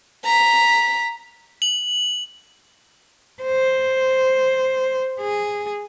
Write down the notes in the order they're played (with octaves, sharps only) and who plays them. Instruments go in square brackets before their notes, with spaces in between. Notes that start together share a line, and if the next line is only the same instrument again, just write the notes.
[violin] A#5 B6
[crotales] F#7
[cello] C5
G#4